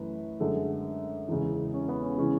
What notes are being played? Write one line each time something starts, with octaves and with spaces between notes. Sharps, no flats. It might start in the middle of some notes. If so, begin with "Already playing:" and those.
Already playing: F#2 E3 A3 B4
F#2 D3 G#3 A4
E2 C#3 G#3
C#4
B3
C#4
C#3 E3 G#3 C#4